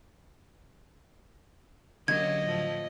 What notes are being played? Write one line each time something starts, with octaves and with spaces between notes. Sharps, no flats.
D3 F#3 A#3 C#4 G4 D#5 G#6
A2 F3 A3